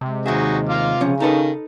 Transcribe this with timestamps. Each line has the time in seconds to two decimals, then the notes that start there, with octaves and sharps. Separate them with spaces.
0.01 C3 G#3
0.26 D#2 D#4 F#4 G#4 E5
0.69 F4 D6 F6
1.01 C#3 F3 C#4
1.20 D#3 D#4 A4 B4